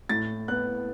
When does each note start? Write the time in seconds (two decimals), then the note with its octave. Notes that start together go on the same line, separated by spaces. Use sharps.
0.09 A2 A6
0.48 B3 F#6